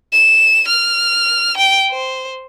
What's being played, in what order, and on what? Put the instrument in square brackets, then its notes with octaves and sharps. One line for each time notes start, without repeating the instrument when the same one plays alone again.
[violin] E7
F6
G5
C5